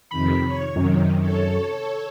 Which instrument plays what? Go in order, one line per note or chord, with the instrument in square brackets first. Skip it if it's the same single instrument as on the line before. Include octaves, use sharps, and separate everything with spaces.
[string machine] F2 C3 D#3 [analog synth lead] B5
[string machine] C#5
[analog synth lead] F#2 [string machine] C3 D#3
[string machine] A4 C#5